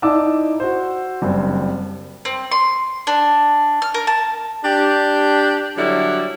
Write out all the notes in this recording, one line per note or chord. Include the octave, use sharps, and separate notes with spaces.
D#4 E4 D5 A5 D6 E6
F#4 C5
F#1 G2 C4
C4
C6
D4
F6
A#4
A5
D4 G4
D3 F#3 G3 E4 D5